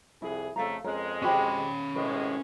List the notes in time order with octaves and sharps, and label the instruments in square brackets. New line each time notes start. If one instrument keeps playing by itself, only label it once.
[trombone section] C2 F2 G#4 [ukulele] E4
[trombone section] F2 C#3 A3 [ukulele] A4 F5 A#5
[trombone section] F2 G#3 [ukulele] C#4 A#4
[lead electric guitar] C#4 B5 [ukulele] F#4 G4 C5
[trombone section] G#1 A2 G#3 [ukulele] B4